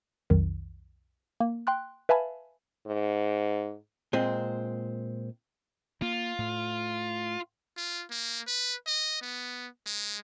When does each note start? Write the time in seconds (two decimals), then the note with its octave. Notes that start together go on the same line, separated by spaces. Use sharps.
0.30 B1 F2 D#3
1.40 A#3
1.67 G5 C6 F#6
2.09 B4 E5 F5 G#5 A5 B5
2.87 G#2
4.13 A#2 G#3 C4
6.02 A#3 F4
6.39 A2
7.77 F4
8.11 A#3
8.47 B4
8.87 D#5
9.22 B3
9.86 G#3